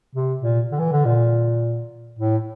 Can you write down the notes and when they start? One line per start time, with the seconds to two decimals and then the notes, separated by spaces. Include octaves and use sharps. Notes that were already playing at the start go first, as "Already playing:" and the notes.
0.15 C3
0.42 A#2
0.72 D3
0.79 E3
0.92 D3
1.05 A#2
2.19 A2